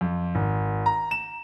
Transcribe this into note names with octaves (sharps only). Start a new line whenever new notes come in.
F2
G#1
A#5
E7